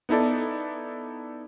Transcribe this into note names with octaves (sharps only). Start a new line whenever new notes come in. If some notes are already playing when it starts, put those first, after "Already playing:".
B3 D#4 E4 A4 D5